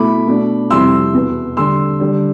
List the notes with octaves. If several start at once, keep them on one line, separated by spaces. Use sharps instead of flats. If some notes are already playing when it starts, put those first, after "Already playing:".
Already playing: B2 A3 E4 B5 D6
B2 A3 D4
F2 C3 G3 C4 E4 C6 E6
E2 B2 B3
D3 G3 D4 C6 E6
D3 G3 D4